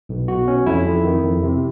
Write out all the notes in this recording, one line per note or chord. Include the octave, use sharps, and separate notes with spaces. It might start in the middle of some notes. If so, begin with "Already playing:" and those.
B1
B2 F#4
C#4
F2 E4
F2
D#3
F2
C3